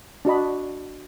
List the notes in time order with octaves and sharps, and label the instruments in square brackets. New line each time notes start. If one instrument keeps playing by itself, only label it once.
[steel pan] D4 F#4 D#5 B5